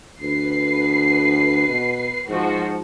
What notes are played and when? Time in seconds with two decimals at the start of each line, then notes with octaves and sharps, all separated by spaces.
0.21 D2 B4 C7
1.69 B2
2.29 G#2 F3 F#4